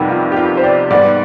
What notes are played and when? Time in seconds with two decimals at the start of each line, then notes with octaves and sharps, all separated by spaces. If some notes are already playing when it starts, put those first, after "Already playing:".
Already playing: F2 C3 D#3 G3 B3
0.09 F4
0.32 G4
0.36 F4
0.57 C5
0.64 D5
0.90 G#2 G3 B3 D5